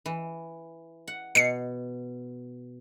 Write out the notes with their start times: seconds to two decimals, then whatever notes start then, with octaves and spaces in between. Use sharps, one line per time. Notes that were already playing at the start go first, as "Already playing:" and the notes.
0.06 E3
1.08 F#5
1.35 B2 C7 C#7